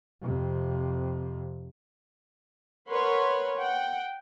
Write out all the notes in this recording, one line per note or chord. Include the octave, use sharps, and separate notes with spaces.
F2 C3
A#4 B4 C#5 F#5 B5 C6
F#5 G5